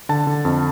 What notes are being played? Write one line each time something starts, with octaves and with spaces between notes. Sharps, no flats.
D3 A5
D3
F2